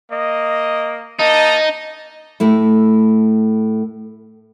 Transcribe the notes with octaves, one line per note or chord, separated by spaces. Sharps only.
A#3 D#5
A#3 D#4 D#5 A5
A2 A3 E4